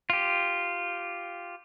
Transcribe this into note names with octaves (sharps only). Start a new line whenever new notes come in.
F4 G4